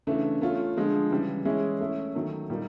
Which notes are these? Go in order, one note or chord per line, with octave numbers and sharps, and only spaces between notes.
C#3 E3 A3 D4
A3 C#4 F4
D3 F3 G#3
C#3 E3 G3
E3 G#3 C#4 E4 G#4
A3 C#4 E4
D#3 F#3 A3
A#2 G3 A#3 D#4